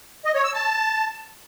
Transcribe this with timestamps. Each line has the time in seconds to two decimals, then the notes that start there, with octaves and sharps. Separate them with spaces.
0.25 D#5
0.35 C#5
0.44 E6
0.54 A5